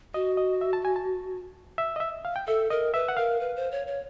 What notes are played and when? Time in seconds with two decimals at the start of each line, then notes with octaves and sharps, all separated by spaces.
0.14 F#4 D#5
0.37 D#5
0.61 E5
0.73 A5
0.85 G#5
0.96 A5
1.78 E5
1.96 D#5
2.00 E5
2.25 F5
2.36 G5
2.47 A4 E5
2.70 A#4 D#5
2.94 B4 E5
3.08 F#5
3.17 A#4 F5
3.40 B4
3.56 C5
3.71 C#5
3.87 C#5